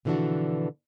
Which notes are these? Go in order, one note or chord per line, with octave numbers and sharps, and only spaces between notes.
B2 D3 E3 F3 D4 F#4